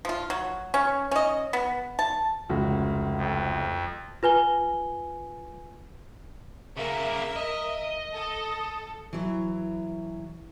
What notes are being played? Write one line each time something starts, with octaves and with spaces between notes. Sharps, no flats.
F3 F4
F#3
C#4
C#4 D#5
B3
A5
F1 C#2 F#4
F2
F4 B4 G#5 G7
C#3 A#3 A#4 E5
D#5
A4
E3 F#3